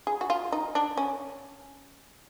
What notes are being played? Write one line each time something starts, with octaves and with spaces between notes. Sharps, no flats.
G#4
F#4
F4
D#4
D4
C#4